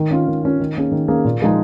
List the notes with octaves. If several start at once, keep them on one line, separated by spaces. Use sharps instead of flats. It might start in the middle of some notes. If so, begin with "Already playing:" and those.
Already playing: D#3
C#4 F4
D#3
C#4 F4
D#3
A#3 C#4 G#4
D#3
A#3 C#4 G#4
A#2
F3 G#3 D#4 G#4